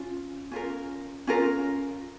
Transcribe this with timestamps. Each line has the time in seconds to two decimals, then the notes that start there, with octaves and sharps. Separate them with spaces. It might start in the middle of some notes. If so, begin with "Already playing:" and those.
Already playing: C#4 F4
0.51 C#4 F4 A#4
1.27 C#4 F4 A#4